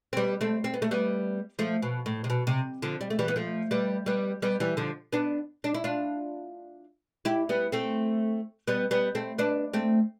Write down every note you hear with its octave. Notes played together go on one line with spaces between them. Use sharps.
C4
G3 B3
A3 C4
C4
B3
A3
G3 B3
F3 A3
B2
A2
C3
B2
C3
D3 F3
G3
A3
E3 G3
B3
F3 A3
G3 B3
G3 B3
G3 B3
E3 G3
D3 F3
B3 D4
D4
E4
D4 F4
E4 G4
G3 B3
A3 C4
G3 B3
G3 B3
A3 C4
B3 D4
A3 C4